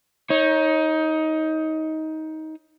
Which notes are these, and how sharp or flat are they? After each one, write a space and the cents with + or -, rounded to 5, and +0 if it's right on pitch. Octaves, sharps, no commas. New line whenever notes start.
D#4 +20 C#5 -15